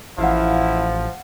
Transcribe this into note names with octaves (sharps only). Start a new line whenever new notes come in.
A1 F3 E4 F5 F#5